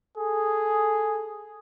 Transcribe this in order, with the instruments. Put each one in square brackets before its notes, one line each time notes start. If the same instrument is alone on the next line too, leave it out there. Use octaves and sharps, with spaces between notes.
[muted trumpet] G#4 [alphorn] A4